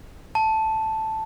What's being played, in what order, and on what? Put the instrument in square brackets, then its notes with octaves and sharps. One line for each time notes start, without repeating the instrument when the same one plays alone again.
[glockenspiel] A5